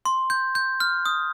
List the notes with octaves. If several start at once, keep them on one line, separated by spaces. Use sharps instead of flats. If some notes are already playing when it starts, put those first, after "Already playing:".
C6
G6
G6
F6
D#6